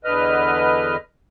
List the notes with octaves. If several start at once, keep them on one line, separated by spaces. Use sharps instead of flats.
E2 D3 B4 D#5 F6